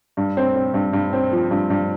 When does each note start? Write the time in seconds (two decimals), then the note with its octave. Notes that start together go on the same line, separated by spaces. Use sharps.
0.17 G2
0.37 C4
0.56 C4
0.74 G2
0.93 G2
1.13 C4
1.32 F3
1.51 G2
1.70 G2